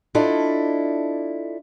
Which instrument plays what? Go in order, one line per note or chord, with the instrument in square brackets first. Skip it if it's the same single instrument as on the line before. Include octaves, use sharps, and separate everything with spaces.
[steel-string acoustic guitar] D4 E4 F4 A4 D5 D#5